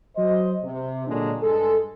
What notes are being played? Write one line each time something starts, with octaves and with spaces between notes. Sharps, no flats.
F#3 C5 D#5
C3
A#2 D3 F#3 G#3 D4
G2 G#3 A4